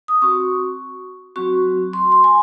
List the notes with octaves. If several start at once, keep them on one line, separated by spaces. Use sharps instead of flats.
D#6
C4 F#4 C#6
F#3 C4 F#4 C#6
C6
C6
G#5